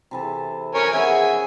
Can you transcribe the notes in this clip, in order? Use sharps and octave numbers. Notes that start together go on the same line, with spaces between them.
C3 E3 A4
A#4 C#5 G#5
B3 C#4 G#4 E5 G#5